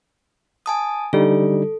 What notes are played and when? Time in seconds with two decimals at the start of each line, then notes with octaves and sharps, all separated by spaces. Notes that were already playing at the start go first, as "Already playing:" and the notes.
0.66 G#5 A5 D#6
1.13 D3 G3 D#4 A4